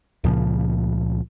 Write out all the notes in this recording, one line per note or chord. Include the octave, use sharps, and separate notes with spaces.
C#2 A#2 C#3 F3